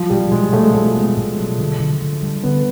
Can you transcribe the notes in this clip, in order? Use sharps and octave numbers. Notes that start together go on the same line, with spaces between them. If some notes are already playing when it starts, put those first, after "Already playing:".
Already playing: F3 F#3
B2 G3
B2 G#3
B2 A3
G#3
B2 A3
B3
B2
F#3
D3
D3
D3
G3
D3 B3